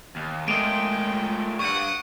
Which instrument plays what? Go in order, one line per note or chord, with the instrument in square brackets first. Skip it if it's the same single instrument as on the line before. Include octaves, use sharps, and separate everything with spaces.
[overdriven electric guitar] D#2
[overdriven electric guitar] A#2 A3 [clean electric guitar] G#3 D#5 [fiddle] G5 [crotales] D7
[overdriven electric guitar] G2 [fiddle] F#5 D#6 [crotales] C#6